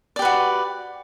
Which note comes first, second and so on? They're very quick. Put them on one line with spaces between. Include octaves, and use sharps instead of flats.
D5 G4 B4 F#4